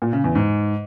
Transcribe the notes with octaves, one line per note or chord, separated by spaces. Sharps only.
A#2
C#3
E2
G#2